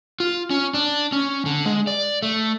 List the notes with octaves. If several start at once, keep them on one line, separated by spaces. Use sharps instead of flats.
F4
C#4
D4
C#4
D3
G#3
D5
A3